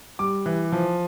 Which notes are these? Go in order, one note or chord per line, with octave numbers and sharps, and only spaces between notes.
G3 D6
E3
F3